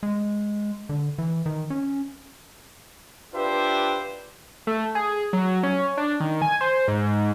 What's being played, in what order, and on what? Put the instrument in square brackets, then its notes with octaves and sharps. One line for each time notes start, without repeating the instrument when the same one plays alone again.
[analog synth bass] G#3
D3
E3
D#3
C#4
[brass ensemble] D4 F4 G4 B4 C5 E5
[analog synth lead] A3
G#4
F#3
C#4
D4
D#3
G#5
C5
G#2